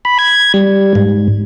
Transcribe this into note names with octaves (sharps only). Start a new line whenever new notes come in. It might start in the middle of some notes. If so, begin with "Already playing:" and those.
B5
G#6
G3
G#2